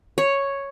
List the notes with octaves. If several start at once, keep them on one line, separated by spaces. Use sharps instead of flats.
C#5